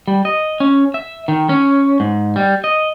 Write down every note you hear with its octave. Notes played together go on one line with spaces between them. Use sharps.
G3
D#5
C#4
E5
D#3
C#4
G#2
G3
D#5